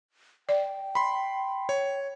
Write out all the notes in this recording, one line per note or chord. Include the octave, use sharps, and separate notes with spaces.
D5 G5
B5 C6
C#5